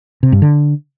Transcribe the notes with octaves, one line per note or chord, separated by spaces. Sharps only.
C3
G2
D3